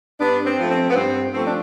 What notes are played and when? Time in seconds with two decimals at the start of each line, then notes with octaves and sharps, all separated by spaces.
0.20 G2 B3 D4
0.46 C4
0.58 F3 A3
0.71 C4
0.90 B3
0.96 G2 C4
1.34 F3 A3 C4
1.45 D4